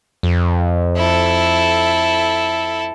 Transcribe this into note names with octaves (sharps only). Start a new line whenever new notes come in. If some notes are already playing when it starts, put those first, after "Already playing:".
F2
E4 A4